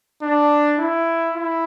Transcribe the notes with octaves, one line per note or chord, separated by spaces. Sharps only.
D4
E4
E4